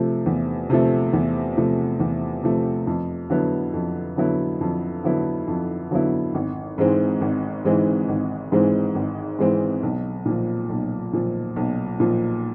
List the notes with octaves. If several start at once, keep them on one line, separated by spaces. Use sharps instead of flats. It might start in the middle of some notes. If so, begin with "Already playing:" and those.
Already playing: C3 F3 A3
E2
C3 F3 A3
E2
C3 F3 A3
E2
C3 F3 A3
F2
D3 F#3 B3 E4
F2
D3 F#3 B3 E4
F2
D3 F#3 B3 E4
F2
D3 F#3 B3 E4
G#1
G#2 E3 G#3 C4
G#1
G#2 E3 G#3 C4
G#1
G#2 E3 G#3 C4
G#1
G#2 E3 G#3 C4
B1
A#2 F3
B1
A#2 F3
B1
A#2 F3